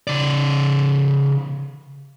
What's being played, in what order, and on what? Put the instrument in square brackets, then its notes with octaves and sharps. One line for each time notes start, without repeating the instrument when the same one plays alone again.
[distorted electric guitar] C#3 D5